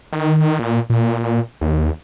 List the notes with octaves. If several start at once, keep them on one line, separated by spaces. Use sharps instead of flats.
D#3
A#2
A#2
D#2